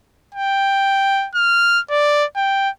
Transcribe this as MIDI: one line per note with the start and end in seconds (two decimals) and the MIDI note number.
0.35 1.28 79
1.35 1.80 89
1.91 2.24 74
2.37 2.69 79